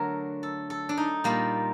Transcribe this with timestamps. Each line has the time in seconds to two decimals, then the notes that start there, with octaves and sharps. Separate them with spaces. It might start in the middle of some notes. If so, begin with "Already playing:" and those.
Already playing: D3 F#3 A3 A#4
0.43 A4
0.70 A4
0.89 D4
0.97 D#4
1.24 A#2 G3 A#3